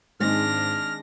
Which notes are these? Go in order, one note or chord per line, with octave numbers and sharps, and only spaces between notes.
G#2 D#3 G#3 C4 D4 F6 A#6